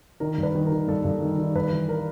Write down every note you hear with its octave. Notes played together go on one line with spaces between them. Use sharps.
D#3 A#4
G2
B4
D#3
A#4
D#3
G2 A4
G2
D#3
D#3
G2 B4
E3
A#4